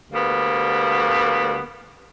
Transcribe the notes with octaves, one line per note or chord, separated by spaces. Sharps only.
D2 G3 A#3 B3